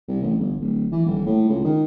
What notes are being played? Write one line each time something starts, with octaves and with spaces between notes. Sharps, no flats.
C2
A1
G1
D1
E3
D#1
A2
C#2
D#3